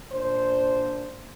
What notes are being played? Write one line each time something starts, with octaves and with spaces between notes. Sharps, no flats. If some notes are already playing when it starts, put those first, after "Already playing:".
A#2 D4 C5